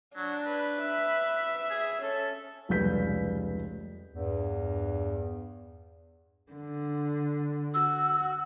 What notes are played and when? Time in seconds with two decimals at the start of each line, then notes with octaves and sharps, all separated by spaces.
0.16 F#3 D4
0.46 B4
0.82 E5
1.70 G#4
2.03 C#4 A4
2.69 F1 C#2 G3 B4 G6 B6
4.12 E2 G2
6.52 D3
7.74 F#4 E6